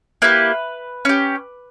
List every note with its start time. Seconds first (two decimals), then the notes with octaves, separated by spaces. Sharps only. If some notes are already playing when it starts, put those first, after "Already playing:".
0.22 A#3 E4 G4 B4
1.05 C#4 G4